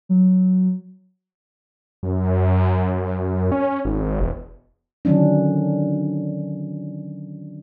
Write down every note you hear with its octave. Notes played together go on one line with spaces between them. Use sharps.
F#3
F#2
C#4
G#1
E1
D3 D#3 F#3 C#4 D4